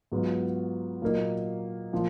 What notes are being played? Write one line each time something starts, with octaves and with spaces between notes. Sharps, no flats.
G#2 F#3 B3 F4
A#2 F#3 A#3 D#4
A#2 F3